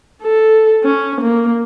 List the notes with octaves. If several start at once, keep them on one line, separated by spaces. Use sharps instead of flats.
A4
C#4
A#3